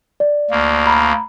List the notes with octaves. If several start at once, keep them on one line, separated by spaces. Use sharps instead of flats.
D5
D2 A#3
A#5 B5